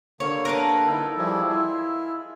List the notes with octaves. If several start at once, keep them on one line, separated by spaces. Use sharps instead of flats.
D3 A#3 G4 C#5 F5
A#4 B4 A5
D#4 E4 A4 G5
E3 F3 G3 G#4 E5
E4 F4 D#5 E5